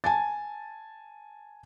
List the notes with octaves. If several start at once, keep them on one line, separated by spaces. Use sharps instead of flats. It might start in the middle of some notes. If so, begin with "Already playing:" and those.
G#5 A5 A6